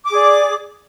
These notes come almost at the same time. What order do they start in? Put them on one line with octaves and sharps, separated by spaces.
D6 G#4 D5